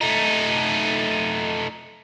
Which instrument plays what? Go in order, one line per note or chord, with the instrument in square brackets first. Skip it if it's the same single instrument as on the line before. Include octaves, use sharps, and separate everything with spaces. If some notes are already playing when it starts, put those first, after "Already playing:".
[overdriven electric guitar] A3 D#4